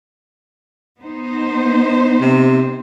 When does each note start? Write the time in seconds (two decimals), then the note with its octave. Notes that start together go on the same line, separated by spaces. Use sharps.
1.00 B3 D#4 C5
2.21 C3